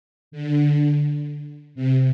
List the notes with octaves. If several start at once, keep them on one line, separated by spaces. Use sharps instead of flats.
D3
C3